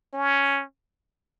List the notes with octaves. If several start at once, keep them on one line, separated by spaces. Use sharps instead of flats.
C#4